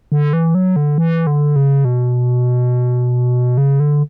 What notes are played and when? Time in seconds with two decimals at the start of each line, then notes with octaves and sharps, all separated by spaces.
0.12 D3
0.33 E3
0.55 F#3
0.76 D3
0.98 E3
1.27 D3
1.56 C#3
1.85 B2
3.57 C#3
3.80 D3